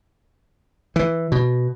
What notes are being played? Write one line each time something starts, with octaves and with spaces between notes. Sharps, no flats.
E3
B2